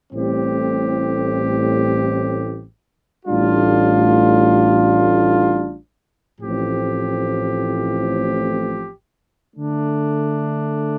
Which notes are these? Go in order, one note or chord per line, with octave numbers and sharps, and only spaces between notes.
A1 A2 G3 C4 G4
A1 A2 G3 D4 F4
A1 A2 F3 C4 G4
D3 A3 D4